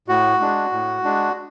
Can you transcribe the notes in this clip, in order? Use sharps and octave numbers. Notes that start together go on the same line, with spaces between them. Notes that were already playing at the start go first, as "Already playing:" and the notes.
A2 F#4
G#3 D4
A2
G#3 D4